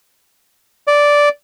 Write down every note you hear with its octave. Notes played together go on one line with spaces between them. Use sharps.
D5